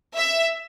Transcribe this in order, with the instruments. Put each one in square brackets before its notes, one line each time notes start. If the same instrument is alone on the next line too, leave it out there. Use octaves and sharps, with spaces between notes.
[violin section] E5